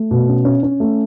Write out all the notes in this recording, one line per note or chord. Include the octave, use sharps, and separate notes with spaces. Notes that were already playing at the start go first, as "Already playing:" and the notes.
Already playing: A3
B2
C#4
C#4
C#4
A3